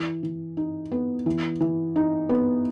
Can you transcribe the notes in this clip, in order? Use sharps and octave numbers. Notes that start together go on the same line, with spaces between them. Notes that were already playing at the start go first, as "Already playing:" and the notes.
Already playing: E3
E3
D#4
B3
E3
E3
D#4
B3